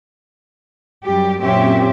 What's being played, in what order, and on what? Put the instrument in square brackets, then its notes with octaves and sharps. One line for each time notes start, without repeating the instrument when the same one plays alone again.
[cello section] F#2 G3 G4
F#2 A#2 C4 C#4 G4 E5